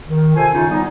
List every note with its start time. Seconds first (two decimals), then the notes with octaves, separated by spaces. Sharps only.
0.08 D#3
0.36 C3 F4 A4 C5 G#5
0.54 F#2 C#3 C#4 D#4 F4
0.70 G3 B3 D#4